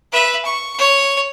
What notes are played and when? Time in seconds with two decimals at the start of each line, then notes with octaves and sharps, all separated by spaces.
0.12 B4 E5
0.45 C#6
0.78 C#5